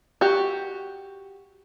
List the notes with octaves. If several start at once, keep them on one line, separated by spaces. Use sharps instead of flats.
F#4 G4